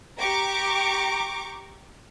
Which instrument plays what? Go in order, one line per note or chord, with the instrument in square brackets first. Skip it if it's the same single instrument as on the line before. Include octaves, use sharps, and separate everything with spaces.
[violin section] G4 A#5 C#6 D6